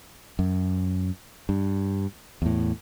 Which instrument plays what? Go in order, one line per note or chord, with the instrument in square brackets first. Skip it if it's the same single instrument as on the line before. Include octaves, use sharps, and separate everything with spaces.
[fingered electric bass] F#2
G2
E2 A2